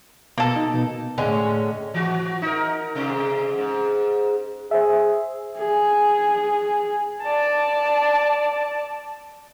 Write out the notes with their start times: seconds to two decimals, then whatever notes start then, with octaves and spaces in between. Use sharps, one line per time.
0.38 B2 A#3 A4
0.56 D#4
0.74 B2
1.18 A2 D3 G#3 C#4
1.94 E3 F#4
2.42 D#4 A#4
2.95 G#2 C3
3.58 G#2
4.71 G#4 C5 E5
5.58 G#4
7.22 D5 A5